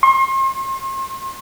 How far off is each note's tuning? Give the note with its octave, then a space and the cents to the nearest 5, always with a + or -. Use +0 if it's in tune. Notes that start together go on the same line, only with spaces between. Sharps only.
C6 +40